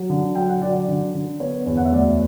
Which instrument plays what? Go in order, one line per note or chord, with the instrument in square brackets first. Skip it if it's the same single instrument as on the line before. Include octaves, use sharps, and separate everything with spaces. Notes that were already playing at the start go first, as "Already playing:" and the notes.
Already playing: [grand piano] F#3
D3
F#3 G5
F#5
F#3 D5
D5
D3
D3
B3 C#5
E2 C#5
F#5
E5
D2 D5